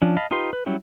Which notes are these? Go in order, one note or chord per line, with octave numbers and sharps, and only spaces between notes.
F3 C#4 D4
D#5 F5 A5 B5
D#4 F4 G4 B4 C6
B4
F#3 G3 C#4 E4 G4